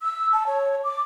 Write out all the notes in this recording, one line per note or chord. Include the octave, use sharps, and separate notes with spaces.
E6
A5
C#5
D6